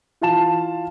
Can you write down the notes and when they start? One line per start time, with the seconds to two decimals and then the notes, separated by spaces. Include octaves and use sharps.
0.21 E3 F4 F5 A5 E7